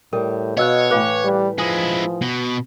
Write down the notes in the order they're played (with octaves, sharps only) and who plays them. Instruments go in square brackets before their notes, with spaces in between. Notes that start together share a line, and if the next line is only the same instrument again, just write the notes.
[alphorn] A2 [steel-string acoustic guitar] G3 [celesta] A#4
[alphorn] B2 [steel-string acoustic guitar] F#4 F5 [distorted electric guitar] C#5 [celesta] D#5 E6 F#6
[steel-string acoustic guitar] A2 E3 B4 [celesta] F5 D6 F#6
[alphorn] G3
[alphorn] F3 [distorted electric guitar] G#3 E4 [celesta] G#5 D#6
[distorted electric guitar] B2